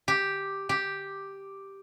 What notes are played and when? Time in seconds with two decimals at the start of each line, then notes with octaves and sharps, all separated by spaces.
0.08 G4
0.69 G4